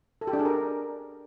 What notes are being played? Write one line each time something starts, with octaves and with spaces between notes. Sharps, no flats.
A4
G4
D4
G#4
A#4